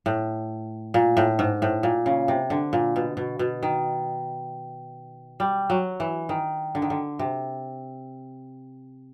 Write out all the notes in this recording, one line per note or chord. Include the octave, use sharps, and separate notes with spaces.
A2
A#2
A2
G#2
A2
A#2
C#3
C3
D3
A#2
B2
B2
B2
D#3
G3
F#3
E3
D#3
D3
D#3
D3
C3